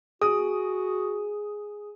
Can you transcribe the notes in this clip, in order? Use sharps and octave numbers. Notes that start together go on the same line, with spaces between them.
F#4 G#4 D#6